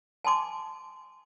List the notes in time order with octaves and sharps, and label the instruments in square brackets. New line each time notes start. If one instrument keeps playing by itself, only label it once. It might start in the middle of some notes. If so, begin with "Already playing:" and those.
[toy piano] G#5 A5 C6 D6